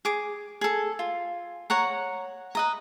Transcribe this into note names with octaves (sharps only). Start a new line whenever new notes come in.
G#4 D6
G#4 A4
F4
C#5 F#5 A#5
B4 D#5 A#5